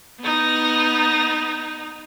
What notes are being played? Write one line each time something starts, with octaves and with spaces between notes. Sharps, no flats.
B3 D#4